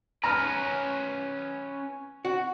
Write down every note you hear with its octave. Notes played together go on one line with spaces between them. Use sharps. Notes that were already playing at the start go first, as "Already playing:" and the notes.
C#4 B4 A#5 F6
F#4